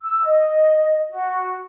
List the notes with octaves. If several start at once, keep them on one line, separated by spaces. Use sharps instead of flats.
E6
D#5
F#4